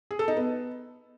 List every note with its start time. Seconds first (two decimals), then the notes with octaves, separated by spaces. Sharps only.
0.11 G#4
0.19 A4
0.28 D#4
0.36 B3